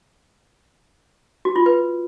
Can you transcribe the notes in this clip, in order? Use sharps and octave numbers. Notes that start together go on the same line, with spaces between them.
F#4
F4
B4